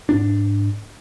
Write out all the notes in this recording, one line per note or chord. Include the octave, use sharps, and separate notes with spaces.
G#2 D4